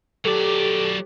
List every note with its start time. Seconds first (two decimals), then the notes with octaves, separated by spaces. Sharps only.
0.25 F#3 G4 A4 D5